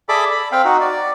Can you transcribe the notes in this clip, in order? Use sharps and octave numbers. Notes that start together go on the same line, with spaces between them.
G#4 A4 D5 E5 B5 D6
B5
C4 F5 G5
D#4 F#4
D5